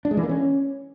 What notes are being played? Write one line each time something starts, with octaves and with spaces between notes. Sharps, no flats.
D4
G#3
E3
A#3
C#4